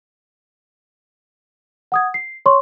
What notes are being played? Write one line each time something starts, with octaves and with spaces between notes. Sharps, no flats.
F#5 D#6 G#6
C7
C#5 C6 C#6